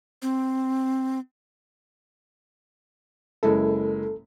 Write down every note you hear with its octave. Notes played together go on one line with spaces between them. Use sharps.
C4
F#1 G#3 E4 A4